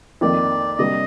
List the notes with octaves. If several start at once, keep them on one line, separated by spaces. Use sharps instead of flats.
F2 D#3 A#3 D#4 D5
C3 G3 A#3 D4 G4 D#5